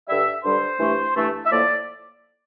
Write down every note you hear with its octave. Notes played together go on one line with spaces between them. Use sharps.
G2 D3 G3 E5
G2 D3 G3 C5
G2 E3 A3
G2 E3 A3
E5
A2 F3 A#3 D5